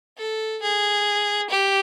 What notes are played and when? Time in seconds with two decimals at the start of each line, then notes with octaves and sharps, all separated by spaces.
0.18 A4
0.62 G#4
1.50 G4